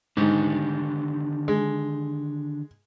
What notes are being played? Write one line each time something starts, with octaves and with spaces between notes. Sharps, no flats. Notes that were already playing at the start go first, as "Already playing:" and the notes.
G#2 D3 D#3 G4
G#3